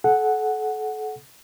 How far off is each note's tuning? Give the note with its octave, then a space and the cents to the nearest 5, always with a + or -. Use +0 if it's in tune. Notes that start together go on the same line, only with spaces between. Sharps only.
A4 -35 F#5 +0